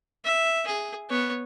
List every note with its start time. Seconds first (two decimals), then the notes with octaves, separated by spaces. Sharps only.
0.25 E5
0.67 G#4
1.10 B3 C#5